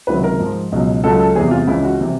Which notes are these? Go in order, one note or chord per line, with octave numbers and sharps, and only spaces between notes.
C#2 C3 D#3 F#3 B4
A#4
G#2 F3
C#2 B2 F#3
C#2 C#3 F#3 A4
A4
E2 C3 E3 G3 G#4
F4
C#2 C#3 E3 E4
F#4
C3 E3 G3